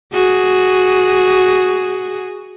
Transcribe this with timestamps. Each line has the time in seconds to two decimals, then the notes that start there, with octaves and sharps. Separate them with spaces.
0.13 F#4 G#4